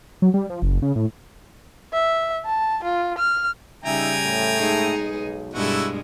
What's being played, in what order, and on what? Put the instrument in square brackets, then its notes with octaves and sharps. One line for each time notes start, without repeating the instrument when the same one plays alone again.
[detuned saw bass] F#3
G3
F3
F#1
C#3
A2
[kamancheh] E5
A5
F4
F6
[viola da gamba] C#3 G3 [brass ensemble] D#4 E5 [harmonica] G5 G#5 A#5
[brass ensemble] A2 A3
[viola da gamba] G#3 D#4 G#4
[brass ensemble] B1
[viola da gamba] G2 B2 G#3 [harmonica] E4 F#4 A4